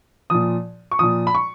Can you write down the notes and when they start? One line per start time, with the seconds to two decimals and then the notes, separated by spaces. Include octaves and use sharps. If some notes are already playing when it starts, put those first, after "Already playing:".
0.30 A#2 F3 D#6
0.91 C#6
0.99 A#2 F3 D#6
1.27 B5
1.35 C#6